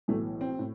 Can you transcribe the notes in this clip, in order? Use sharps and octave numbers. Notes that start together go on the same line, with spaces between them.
B1 A2 E3 A3
C4
A2